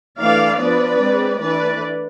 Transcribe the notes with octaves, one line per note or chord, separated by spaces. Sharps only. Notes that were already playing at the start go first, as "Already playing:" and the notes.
E3 A3 D4 D5 F5
F3 B3 D4 B4 D5
G#3 C4
E3 A3 D4 B4 D5